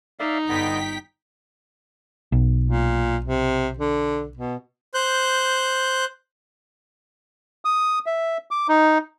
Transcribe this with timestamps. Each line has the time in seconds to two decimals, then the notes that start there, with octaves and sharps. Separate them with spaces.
0.19 D#4 D5 E5 F5
0.49 G1 D3 B3 D#5 G5 B6
2.32 B1
2.64 A#2
3.25 C3
3.78 D3
4.37 B2
4.94 C5 F#6 G6
7.65 D#6
8.06 E5
8.51 D6
8.68 D#4